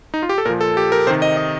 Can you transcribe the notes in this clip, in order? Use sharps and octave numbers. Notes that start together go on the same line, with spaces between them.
D#4
F4
G4
A4
A#2 F3 A#4
A4
G4
A#4
C3 D#3 C5
D#5
D#5